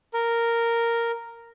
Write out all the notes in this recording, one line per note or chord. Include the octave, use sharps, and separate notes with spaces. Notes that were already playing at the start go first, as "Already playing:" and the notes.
A#4